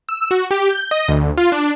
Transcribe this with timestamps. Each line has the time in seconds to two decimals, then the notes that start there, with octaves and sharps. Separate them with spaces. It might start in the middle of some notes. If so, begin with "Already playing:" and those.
0.09 E6
0.31 F#4
0.51 G4
0.69 G6
0.91 D#5
1.08 D2
1.37 F4
1.52 D4